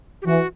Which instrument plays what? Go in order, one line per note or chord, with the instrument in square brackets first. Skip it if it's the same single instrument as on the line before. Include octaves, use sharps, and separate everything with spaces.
[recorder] G4
[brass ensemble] E3 [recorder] F#4